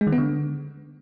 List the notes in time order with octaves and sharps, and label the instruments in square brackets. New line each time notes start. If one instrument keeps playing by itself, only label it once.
[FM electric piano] G#3
D#3
B3
D3